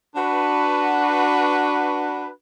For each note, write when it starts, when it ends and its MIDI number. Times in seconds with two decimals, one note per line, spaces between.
0.16 2.28 62
0.16 2.28 66
0.16 2.28 71